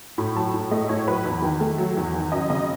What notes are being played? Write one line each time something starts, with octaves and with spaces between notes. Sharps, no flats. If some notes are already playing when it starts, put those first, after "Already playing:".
A2 B5
F#3 A5
A2
A3 D#5
A2 C#5
F#3 B4
E2
D#3
A3
F#3
E2
D#3
F#2 D#5
C#3 D#5